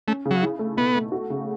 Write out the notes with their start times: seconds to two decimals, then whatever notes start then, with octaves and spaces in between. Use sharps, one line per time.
0.07 A3 C#4
0.25 C#3
0.31 F#3
0.42 E4
0.59 A3
0.77 B2 B3
0.95 A3
1.12 F#4
1.30 C#3